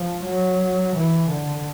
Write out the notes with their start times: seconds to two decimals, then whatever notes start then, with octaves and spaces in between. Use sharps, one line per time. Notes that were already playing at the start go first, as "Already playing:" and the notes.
Already playing: F3
0.25 F#3
0.96 E3
1.30 D3